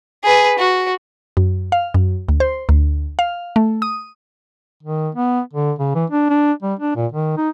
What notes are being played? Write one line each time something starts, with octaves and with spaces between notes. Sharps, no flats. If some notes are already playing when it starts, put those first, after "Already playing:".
G#4 B4
F#4
F#2
F5
F#2
D2
C5
D2
F5
A3
D#6
D#3
B3
D3
C#3
E3
D4
D4
G3
D4
A#2
D#3
D#4